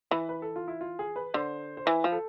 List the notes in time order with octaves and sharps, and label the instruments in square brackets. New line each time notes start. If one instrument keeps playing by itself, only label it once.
[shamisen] E3 [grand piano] B4
[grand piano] B4
A4
F4
E4
F4
G#4
B4
[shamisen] D3 [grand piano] C5
[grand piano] C5
[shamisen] E3 [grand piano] B4
[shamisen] F3
[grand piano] A4